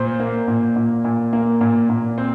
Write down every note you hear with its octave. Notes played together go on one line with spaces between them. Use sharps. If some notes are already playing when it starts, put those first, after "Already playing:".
Already playing: A#2 C5
A#3
A#2
A#2
A#2
A#3
A#2
A#2
C4